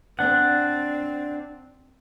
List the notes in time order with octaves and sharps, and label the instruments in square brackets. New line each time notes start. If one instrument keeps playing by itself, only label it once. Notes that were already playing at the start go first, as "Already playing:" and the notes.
[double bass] C4 [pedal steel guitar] D4 F#5